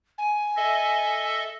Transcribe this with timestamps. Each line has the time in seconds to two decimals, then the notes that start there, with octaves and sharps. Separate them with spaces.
0.18 G#5
0.57 A4 D#5 E5